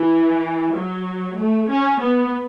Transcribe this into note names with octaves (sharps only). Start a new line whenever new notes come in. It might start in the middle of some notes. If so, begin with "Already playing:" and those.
Already playing: E3
F#3
A3
C#4
B3